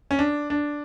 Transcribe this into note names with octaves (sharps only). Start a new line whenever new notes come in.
C#4
D4
D4